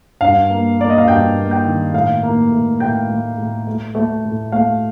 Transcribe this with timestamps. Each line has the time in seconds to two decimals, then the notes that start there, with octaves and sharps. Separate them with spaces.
0.21 G2 F5
0.50 A#3
0.79 A#3 D5
0.90 D#5
0.98 F5
1.08 G2 G5
1.36 A#3
1.51 G5
1.65 D#3
1.93 A2 F5
2.23 A#3
2.51 A2
2.80 A2 G5
3.10 A2
3.38 A2
3.67 A3
3.95 A3
4.25 A2
4.52 A3 F5